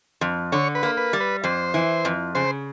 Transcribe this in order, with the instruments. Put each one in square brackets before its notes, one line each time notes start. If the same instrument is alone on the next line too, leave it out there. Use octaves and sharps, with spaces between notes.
[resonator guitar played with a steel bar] F2
[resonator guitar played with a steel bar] D3 [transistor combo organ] C#5
[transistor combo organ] B4
[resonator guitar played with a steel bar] A#3
[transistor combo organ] B4
[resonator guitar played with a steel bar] G3
[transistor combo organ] B4
[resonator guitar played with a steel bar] F2 [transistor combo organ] C5
[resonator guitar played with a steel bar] E3
F2
[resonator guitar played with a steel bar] C#3 [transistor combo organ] C5